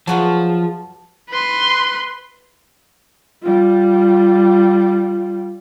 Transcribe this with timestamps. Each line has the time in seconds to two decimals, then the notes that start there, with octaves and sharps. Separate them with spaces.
0.07 F3 F#3 F#4 G#4 B4 A5
1.30 B4 C6
3.42 G3 F4